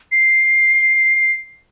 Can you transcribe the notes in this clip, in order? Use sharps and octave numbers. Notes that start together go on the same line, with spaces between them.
C7